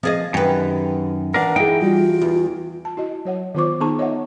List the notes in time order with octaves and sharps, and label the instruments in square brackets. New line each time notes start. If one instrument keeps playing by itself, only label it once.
[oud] F3 G#4 D#5 [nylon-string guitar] C4
[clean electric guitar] F#2 [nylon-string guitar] D#3 [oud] G4 B4
[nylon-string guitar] E3 F5 [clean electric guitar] D4 A#4 [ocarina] F#5
[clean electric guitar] E3 G5 [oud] D#4 [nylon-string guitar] E4 G#4
[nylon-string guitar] G3 F#4 [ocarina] F4
[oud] E2
[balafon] A5
E4 F#4 D#5
F#3 C#5 F#5
D#3 B3 F4 C5 C#6 D6
B3 D#4 G#4 A5 A#5 C#6
C#5 D#5 E5 F#5